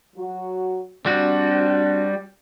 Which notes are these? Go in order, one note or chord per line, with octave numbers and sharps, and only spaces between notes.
F#3 F#4
G3 C4 D4 F#4